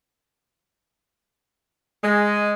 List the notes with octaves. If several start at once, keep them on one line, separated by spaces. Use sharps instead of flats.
G#3